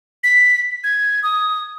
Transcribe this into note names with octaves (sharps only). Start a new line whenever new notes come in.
B6
G#6
D#6